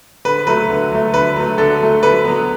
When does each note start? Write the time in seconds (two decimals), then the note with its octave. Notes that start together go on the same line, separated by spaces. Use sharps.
0.25 D3 B4
0.47 F#3 A3 B4
0.70 D3
0.92 F#3 A3
1.14 D3 B4
1.36 F#3 A3
1.58 D3 A4
1.81 F#3 A3
2.02 D3 B4
2.24 F#3 B3